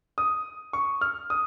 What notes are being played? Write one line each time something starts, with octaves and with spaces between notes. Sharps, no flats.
D#6
C#6
F6
D#6